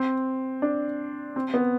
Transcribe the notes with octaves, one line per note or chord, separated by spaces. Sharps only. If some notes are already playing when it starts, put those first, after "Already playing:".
Already playing: C4
D4
C4
B3